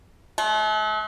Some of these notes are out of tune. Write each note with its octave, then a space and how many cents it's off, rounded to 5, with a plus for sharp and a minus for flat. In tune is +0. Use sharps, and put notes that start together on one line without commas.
A3 -45